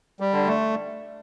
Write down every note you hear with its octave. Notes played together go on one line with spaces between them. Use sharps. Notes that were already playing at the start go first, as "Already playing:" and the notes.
G3
D3
A3